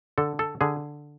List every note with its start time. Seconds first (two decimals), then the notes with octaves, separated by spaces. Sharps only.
0.18 D3 A4
0.39 A4
0.61 D3 G#4